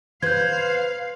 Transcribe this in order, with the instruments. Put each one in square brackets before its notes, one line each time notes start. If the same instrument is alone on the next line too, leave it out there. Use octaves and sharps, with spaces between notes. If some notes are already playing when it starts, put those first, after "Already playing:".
[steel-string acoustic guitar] B4 C5 [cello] F5 [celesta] G6 G#6